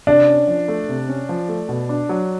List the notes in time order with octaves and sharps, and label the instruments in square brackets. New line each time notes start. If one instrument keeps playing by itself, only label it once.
[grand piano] C3 [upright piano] D4
[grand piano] C#4
F3
A3
C3
C#4
F3
A3
B2
D4
F#3